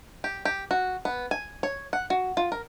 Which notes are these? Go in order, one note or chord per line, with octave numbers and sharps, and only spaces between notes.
G4
G4
F#4
B3
G#5
C#5
F#5
F#4
F4
A#4